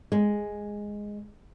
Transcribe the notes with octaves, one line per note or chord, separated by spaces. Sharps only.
G#3